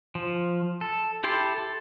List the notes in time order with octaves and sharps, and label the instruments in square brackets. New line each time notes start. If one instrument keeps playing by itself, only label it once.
[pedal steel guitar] F3
A4
E4 G4 A4 C6
A4